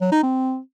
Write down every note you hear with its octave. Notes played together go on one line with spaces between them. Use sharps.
F#3
D#4
C4